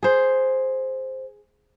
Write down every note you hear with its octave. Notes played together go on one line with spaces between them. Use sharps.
G#4 C5